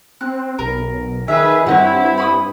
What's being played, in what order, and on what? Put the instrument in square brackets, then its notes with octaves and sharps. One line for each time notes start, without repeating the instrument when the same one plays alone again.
[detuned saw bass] C4 [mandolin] F#6
[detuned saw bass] B1 [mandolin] A#4
[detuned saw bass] D#3 [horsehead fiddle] G#4 B4 [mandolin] E5
[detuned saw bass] G2 [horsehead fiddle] C4 E4 [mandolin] C#5 D#5 F#5
[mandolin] B5 C#6 D#6